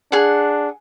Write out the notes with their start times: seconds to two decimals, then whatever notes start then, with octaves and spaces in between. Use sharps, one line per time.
0.12 D4 G#4 F#5